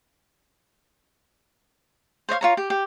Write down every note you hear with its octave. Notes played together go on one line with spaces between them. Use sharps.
C5 C#5 D#5 F5
F4 C#5 A#5
G4
G4